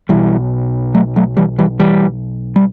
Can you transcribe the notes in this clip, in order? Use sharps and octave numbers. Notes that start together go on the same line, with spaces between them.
B1 B2 E3 G3
F#3 A3
F#3 A3
E3 G3
E3 G3
E3 G3
G3